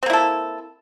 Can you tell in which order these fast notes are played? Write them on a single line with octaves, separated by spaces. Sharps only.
C4 A#3 E4 A4